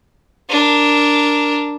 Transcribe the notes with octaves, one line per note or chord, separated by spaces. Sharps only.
D4 A#4